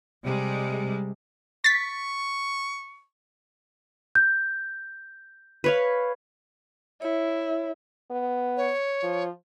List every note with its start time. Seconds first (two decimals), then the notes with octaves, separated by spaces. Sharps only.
0.24 C3 G3 G#3
1.64 C#6 A6 B6
4.15 G6
5.64 B4 C#5 F5
7.02 E4 C#5
8.11 B3
8.57 C#5
9.03 F3